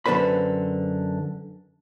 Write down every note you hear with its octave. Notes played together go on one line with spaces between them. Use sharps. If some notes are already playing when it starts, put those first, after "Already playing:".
F#2 D3 B4 C5 B5